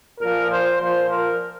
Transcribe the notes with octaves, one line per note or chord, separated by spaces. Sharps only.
A#2 F3 A#4
C5
A#2 F3 C5
A#4